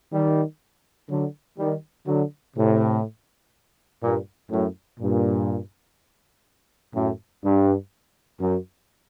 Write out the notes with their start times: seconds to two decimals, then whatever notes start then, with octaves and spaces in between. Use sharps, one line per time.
0.12 D#3 G3
1.09 D3 F#3
1.58 D#3 G3
2.07 D3 F#3
2.56 A2 C3
4.02 G2 A#2
4.51 F#2 A2
5.00 G2 A#2
6.94 F#2 A2
7.44 G2
8.41 F#2